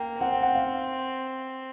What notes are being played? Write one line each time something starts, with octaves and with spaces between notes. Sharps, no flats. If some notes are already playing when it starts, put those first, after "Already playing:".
Already playing: A#3 G5
C4 F#5
G5
F#5
F5